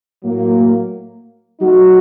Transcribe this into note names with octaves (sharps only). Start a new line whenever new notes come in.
A2 F#3 A#3
F#3 A3 D#4 F#4